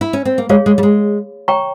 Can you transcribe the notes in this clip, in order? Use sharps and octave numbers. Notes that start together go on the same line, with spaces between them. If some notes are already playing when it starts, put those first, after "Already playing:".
E4
C#4
C4
A#3
G#3 G#4 C#5 F5
G#3
G3
G#3
G#4 C#5 G5 A#5 C#6